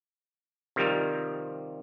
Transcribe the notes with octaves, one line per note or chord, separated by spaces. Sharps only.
C3 D#3 F3 G3 A#4